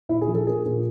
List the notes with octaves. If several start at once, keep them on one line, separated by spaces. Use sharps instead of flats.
A#2 E4
G#4
F3
A4
A#3 G#4
A#2